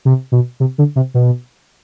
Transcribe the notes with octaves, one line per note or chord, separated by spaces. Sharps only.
C3
B2
C3
D3
C3
B2